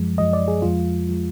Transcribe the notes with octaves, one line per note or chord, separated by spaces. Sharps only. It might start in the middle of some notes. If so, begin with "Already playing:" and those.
Already playing: F#2 F3 G#3
F#2 F3 G#3 D#5
D5
G#4
F2 F3 G#3 F4
F3 G#3